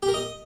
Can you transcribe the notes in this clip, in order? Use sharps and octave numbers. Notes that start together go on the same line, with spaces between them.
G4
A#4
D#5